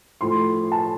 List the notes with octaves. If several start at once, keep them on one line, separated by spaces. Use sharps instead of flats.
A2 F3 A3 C6
A5